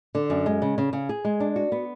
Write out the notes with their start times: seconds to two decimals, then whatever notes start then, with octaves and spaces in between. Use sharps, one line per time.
0.15 D3
0.30 F#2
0.46 G#3
0.62 C#3
0.78 C#3
0.93 C#3
1.09 G#4
1.25 G#3
1.40 D4
1.56 F#4
1.72 B3